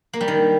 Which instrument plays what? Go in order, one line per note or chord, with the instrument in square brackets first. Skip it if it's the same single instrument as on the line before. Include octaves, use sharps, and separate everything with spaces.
[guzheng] A#3
G3
D#3